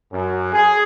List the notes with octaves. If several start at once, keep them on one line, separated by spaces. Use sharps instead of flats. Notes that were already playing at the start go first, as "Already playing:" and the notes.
F#2
G#4